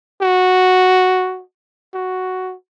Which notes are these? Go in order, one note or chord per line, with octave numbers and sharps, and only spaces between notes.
F#4
F#4